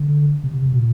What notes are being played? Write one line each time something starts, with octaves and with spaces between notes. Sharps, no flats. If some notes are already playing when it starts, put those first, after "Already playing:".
Already playing: D3
C3
C3
A#2